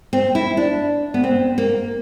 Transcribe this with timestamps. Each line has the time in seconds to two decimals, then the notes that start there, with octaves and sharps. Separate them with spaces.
0.13 C4
0.35 E4
0.57 D4
1.14 B3
1.24 C4
1.58 A#3